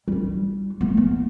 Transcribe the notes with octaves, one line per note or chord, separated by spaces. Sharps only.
G3 D4
A3 B3
A#3